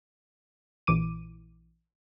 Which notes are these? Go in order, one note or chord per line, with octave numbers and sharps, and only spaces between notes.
A#1 E3 D6 D#7